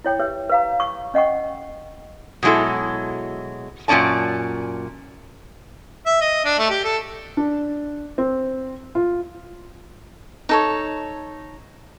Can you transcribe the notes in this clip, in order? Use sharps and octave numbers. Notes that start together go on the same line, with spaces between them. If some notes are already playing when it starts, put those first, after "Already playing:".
E4 C#5 G5
G4 B4 C#5 E5
B4 F5 A#5
C#6
C#4 D#5 F#5 G5 C#6
B2 F#3 G#3 E4 A4
F#2 A#2 G#3 C#4 D5 A5
E5
D#5
D4
A3
G4
A4
D4
C4
F4
D#4 A4 C#5